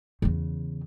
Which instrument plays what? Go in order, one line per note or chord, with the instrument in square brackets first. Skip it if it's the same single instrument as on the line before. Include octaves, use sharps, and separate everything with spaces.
[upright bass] E2 C#3